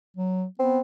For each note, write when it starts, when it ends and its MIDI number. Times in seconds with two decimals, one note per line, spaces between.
0.17 0.45 54
0.59 0.81 59
0.59 0.81 60